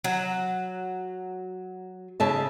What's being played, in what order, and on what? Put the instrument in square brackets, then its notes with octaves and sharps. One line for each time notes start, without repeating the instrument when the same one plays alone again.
[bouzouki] F#3
[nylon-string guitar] C#3 E5 A5